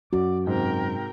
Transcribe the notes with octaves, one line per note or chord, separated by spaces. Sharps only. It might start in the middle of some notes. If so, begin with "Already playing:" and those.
F#2 F#4 D5
G#2 C3 A#4 G5